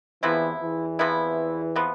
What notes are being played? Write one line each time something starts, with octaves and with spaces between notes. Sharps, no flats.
E2 C3 E3 F3 B3 E4
E2 E3
C3 F3 B3 E4
C3 F3 B3